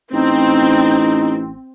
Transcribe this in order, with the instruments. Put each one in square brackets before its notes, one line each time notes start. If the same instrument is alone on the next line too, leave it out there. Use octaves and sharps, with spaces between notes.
[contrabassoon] A1 [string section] C4 [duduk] D#4